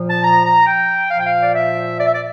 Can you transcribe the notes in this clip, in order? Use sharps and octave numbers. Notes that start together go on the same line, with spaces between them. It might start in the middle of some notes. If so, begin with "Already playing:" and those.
Already playing: A#2 F3
A5
A#5
A#5
G5
A#2 F3 F5
G5
F5
D5
E5
D5
E5
D5